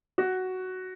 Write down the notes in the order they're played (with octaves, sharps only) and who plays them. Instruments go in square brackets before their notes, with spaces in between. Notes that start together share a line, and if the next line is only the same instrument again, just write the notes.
[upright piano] F#4